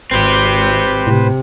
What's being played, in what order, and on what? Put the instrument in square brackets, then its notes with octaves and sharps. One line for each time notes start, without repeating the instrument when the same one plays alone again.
[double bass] G#1 [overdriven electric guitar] C4 G4 [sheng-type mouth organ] B4 C5
[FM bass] A2 [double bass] C3